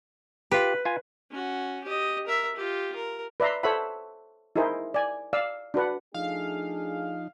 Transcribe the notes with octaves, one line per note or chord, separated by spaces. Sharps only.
F4 G4 B4
F4 G#5
C#4 F#4
G4 D#5
A#4 E5
F4 G4
A#4
B4 D5 E5 A#5 C6
A4 C5 C#5 E5 F#5 B5
D#4 E4 G#4 A#4 C5
D5 G#5
D5 F5 E6
D4 F#4 B4 F#5
F3 A3 D4 D#4 G#4 F5